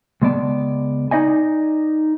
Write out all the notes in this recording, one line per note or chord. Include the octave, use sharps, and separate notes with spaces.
C#2 G#3 B3 D5 A5
D#4 D5 D#5 G#5